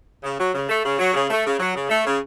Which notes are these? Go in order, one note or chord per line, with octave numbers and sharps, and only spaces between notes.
C#3
F#3
C#3
A3
C#3
F#3
C#3
A3
C#3
F#3
C#3
A3
C#3